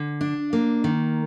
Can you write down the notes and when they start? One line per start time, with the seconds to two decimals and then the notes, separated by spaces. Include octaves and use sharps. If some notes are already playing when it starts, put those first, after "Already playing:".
Already playing: D3
0.21 D4
0.53 A#3
0.84 D#3